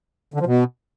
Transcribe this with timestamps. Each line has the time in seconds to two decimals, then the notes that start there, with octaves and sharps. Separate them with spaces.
0.34 D3
0.40 F3
0.46 B2